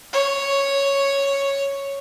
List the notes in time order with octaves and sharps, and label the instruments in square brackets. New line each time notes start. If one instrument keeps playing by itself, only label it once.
[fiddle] C#5